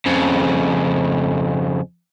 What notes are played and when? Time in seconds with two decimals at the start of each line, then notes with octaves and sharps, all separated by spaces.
0.06 F2 C#3